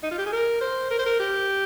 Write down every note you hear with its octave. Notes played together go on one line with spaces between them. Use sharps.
D#4
F4
G4
G#4
A#4
C5
A#4
C5
A#4
G4